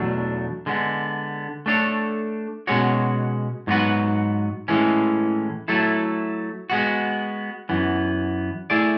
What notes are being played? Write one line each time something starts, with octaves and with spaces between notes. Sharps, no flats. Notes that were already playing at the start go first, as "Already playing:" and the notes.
Already playing: E2 B2 F#3 A3 D4
D3 G#3 B3
A3 D4 A4 C#5
B2 G#3 C#4 F#4 C#5
G#2 F#3 B3 F#4 B4
A2 E3 G#3 C#4
F#3 A3 E4 A4
G#3 B3 F#4
F#2 E3 B3
A3 E4 G#4 D5